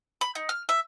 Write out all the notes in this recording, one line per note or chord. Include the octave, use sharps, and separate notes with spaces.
B5
D#4
F6
E5